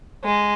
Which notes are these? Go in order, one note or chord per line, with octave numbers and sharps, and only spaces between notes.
G#3